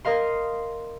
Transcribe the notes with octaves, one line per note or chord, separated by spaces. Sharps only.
A#4 D#5 F5 C6